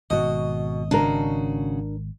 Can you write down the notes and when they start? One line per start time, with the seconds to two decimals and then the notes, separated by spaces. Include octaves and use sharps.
0.10 G#1 B2 F#4 D#5
0.91 C#3 D4 F#4 A#4